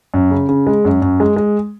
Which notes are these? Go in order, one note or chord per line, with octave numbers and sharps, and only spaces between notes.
F#2
C#3
C#3
G#3
F#2
F#2
G#3
G#3